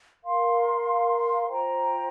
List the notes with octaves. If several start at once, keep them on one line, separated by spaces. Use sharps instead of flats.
A#4 F5 C6
F4 C5 G5 A#5